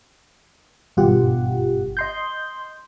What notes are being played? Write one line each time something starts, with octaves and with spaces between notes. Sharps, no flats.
G#1 G2 B2 F4 G4 F#5
D#5 C6 G6